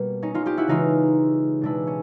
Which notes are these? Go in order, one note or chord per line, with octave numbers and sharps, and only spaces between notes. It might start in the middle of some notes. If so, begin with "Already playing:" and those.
Already playing: B2 G3 A#3
C#4 D#4
D#4 F4
F4 G4
E4 F#4
C#3 E3 G#3 D#4 F4
B2 G#3 D4 E4
C#4